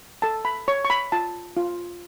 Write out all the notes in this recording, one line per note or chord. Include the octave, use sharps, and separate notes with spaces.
A4 A5
B5
C#5 C#6
C#6
B5
F4 A5
F4